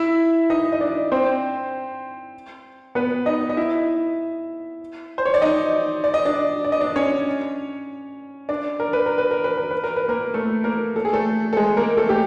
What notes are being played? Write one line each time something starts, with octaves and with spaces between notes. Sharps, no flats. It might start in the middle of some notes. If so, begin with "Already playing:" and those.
Already playing: E4 E5
D#4 D#5
D#5
D4 D5
C4 C5
B3 B4
D#4 D#5
D#5
E4 E5
C5
C#5
D5
D#4 D#5
D5
D#5
D4 D5
D5
D#5
D4 D5
C#4 C#5
D4 D5
A#4
B4
A#4
B4
A#4
B4
A#4
B4
A#4
B4
A#3 A#4
A3 A4
A#3 A#4
A4
G#4
A3 A4
A4
G#3 G#4
A#3 A#4
A3 A4
G4